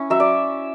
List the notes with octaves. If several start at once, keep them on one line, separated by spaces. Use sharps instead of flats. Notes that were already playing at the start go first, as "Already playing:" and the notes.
Already playing: C#4 E4
F#3 E5
D5